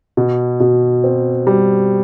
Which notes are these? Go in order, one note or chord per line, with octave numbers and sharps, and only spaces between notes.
B2
B2
C4
G3